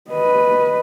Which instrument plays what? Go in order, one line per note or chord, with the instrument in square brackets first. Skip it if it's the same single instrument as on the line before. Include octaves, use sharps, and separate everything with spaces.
[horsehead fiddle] B4 D#5